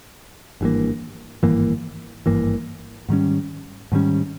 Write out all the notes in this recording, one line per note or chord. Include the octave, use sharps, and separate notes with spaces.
G#1 G2 E3 A#3
G#1 G2 E3 A#3
G#1 G2 E3 A#3
G#2 D#3 G3 C#4
G#2 D#3 G3 C#4